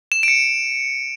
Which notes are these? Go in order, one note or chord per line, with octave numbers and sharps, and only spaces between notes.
E7
D7
C#7